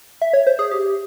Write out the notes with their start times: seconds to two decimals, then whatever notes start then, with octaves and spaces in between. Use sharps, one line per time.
0.22 E5
0.33 C#5
0.47 C5
0.59 G#4
0.71 G4